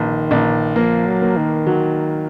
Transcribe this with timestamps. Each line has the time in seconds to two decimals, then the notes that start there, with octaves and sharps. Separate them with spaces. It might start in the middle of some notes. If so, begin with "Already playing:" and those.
Already playing: A#1 D#3
0.31 A#1
0.76 F3 A#3
1.06 F#3
1.22 A#3
1.37 D#3
1.67 F#3